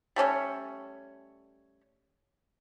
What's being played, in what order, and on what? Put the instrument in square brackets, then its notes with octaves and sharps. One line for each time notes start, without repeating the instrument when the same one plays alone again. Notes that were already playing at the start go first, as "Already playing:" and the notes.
[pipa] G3 A3 C#4 C#5